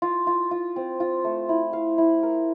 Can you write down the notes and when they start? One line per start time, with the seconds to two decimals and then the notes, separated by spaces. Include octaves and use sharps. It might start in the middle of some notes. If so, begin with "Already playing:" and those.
0.02 F4
0.27 F4
0.51 F4
0.76 C4
1.00 F4
1.24 A3
1.49 E4
1.73 F5
1.98 E4
2.23 A#4